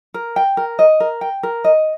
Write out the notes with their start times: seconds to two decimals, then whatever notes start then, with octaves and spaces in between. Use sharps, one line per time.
0.14 A#4
0.36 G5
0.57 A#4
0.79 D#5
1.00 A#4
1.21 G5
1.43 A#4
1.65 D#5